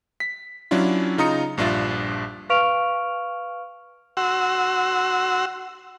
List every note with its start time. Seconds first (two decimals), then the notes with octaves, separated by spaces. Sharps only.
0.20 B6
0.71 F#3 C#4 D4 E4 F4
1.18 C#3 D#4 F4 A#5 D#6 C#7
1.57 A#1 G2 D4 F4 E5 A6
2.50 B4 F5 C#6 F6 D7 F7
4.17 F#4 F#5 C6 E6